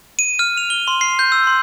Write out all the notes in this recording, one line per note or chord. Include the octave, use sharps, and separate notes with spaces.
D#7
F6
F7
G7
C6
C7
G6
E6
C6